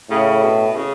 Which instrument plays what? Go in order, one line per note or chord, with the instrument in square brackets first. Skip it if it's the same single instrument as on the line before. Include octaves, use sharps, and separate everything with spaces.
[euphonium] A2 [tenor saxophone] C#3
[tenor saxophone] B2
C#3